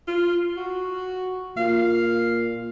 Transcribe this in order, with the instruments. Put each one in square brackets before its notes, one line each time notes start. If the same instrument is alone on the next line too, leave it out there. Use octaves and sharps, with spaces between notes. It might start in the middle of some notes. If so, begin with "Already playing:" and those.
[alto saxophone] F4
F#4
[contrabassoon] A#2 [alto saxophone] F5